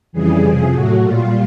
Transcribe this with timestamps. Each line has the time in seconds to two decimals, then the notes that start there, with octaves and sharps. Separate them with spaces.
0.12 F2 C#3 E3 G3 G#4
0.42 F2 C3 F3
0.72 A2 F#3 A3 F#4
1.02 A#2 G3 F4